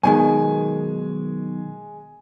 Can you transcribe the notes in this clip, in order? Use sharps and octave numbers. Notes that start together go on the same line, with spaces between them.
B1 B2 D#3 G#3 G#5